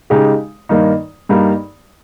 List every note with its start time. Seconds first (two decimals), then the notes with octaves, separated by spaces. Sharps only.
0.10 C#3 G#3 D#4 G4
0.69 G2 D#3 A#3 D#4
1.29 G2 G3 A#3 D#4 G4